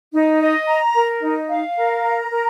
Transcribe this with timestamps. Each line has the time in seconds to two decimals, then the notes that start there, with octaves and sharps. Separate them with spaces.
0.13 D#4
0.40 D#5
0.67 A#5
0.94 A#4
1.21 D#4
1.49 F5
1.76 A#4
2.03 A#5
2.30 A#4